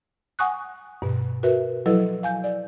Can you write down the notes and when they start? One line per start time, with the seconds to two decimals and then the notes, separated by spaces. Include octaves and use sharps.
0.39 F#5 G#5 C#6 D#6 F#6
1.02 G2 B2
1.43 F#4 A#4 B4 E5
1.86 F3 F#3 E4 A4 B4 D#5
2.23 F5 G#5 G6
2.44 D5